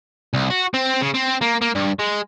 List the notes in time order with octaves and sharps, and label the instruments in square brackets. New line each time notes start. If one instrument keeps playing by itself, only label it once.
[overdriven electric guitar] C2
F#4
C4
C#3
C4
A#3
A#3
G2
G#3